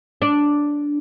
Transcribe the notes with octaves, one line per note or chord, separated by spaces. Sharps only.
D4